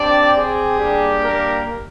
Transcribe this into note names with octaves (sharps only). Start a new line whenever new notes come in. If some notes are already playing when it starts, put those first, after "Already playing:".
Already playing: C4 D4 G4 D5
G#4
G3 A#3 D4 G4
A#3 A#4